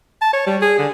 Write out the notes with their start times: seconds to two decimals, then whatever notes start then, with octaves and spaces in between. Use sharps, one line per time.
0.21 A5
0.33 C#5
0.47 G3
0.62 G#4
0.79 D3